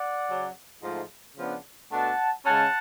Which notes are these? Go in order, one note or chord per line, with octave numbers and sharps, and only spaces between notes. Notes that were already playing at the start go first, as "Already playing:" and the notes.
Already playing: D5 F#5
C#3 F#3 C#4
G#2 F3 A3
C#3 F3 B3 D4
B2 A3 D4 F#5 A5
C#3 G#3 C#4 F#5 A5